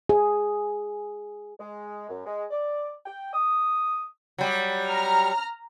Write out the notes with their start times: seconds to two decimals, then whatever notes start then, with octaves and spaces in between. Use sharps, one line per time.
0.09 G#4
1.59 G#3
2.09 F#2
2.25 G#3
2.51 D5
3.05 G5
3.33 D#6
4.38 F#3 G3
4.89 A#5 F6